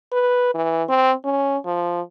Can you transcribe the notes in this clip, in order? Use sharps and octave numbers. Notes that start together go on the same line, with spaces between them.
B4
E3
C4
C#4
F3